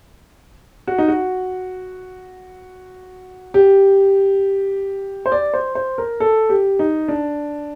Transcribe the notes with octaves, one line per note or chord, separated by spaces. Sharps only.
F#4
D#4
F#4
G4
C5
D5
C5
C5
A#4
A4
G4
D#4
D4